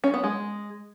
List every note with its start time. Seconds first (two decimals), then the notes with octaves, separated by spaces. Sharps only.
0.04 C#4
0.14 B3
0.24 G#3